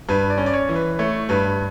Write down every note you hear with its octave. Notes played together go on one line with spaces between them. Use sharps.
G2 B4
D5
C#4
D5
C#5
E3
B4
A3 C#5
G2 B4